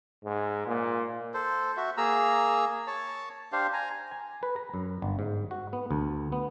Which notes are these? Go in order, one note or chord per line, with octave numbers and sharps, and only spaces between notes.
G#2
A#2
A4 C5
F#4 E5
A#3 G#4 A#5 E6
C#5 A5
D4 G4 C5 F5
G#5 A#5
G#5
B4
A#5
F#2
G1
G#2
F#4
B3
D2
B3